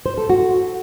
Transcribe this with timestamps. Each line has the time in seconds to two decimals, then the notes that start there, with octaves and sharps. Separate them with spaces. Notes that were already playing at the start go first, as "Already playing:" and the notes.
0.06 C5
0.18 A4
0.30 F#4